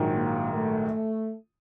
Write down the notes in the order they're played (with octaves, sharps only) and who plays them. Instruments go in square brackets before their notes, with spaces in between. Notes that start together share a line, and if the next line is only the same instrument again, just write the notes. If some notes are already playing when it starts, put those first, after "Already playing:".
Already playing: [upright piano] A#1 G#2 D#3 F#3
[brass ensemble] A#3
A3